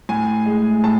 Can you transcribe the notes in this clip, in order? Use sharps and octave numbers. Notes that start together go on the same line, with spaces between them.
A2 G#5
G#3
A2 A5